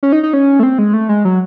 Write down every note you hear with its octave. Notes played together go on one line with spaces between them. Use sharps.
C#4
D#4
D#4
C#4
A3
C4
G#3
A3
G#3
F#3